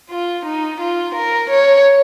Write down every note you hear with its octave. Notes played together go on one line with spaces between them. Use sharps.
F4
D#4
F4
A#4
C#5